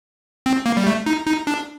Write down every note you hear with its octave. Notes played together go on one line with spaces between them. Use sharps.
C4
A#3
G3
A3
D#4
D#4
D4